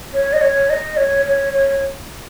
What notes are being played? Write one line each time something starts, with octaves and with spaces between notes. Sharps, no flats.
C#5
D#5
C#5
D#5
C#5
C#5
C#5